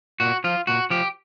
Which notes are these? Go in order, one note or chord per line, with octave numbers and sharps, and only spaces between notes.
A#2 F#4
F3 F4
A#2 F#4
F3 G4